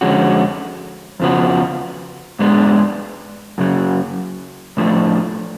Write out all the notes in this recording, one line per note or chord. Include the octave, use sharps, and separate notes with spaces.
F2 D3 G#3 C#4 F#4
F2 C#3 F3 B3 F#4
G#2 G#3 B3 D4
F#2 C#3 F#3
A2 F3 A3 D4